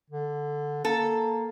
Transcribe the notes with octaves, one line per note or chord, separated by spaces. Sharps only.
D3
A#3 A4